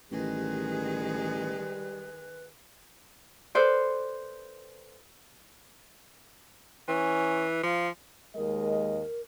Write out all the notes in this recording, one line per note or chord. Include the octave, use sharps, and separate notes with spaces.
A1 D#3 G3 G#3 G#4 B4
A4 B4 C5 D5
E3 C#4
F3 F5
D#2 G#3 A#4 D#5